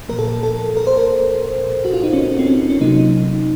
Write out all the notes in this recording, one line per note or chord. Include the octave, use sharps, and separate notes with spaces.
A#2 F3 A#3 A#4
A4
A#4
A4
A#4
C5
A#4
F#4
F4
D#4
C#4
C4
C#4
C#4
C3 F#3 A#3 D#4